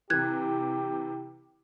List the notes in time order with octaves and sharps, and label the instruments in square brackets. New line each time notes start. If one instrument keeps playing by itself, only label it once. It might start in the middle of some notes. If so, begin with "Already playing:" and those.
[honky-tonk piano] C3 E3 [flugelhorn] G4 [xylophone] F#6 G#6